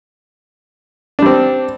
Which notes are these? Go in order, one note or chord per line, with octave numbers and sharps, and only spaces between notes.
G3 C4 D4